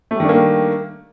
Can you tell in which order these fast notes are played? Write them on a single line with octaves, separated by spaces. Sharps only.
A3 G3 D#3 D4 A#3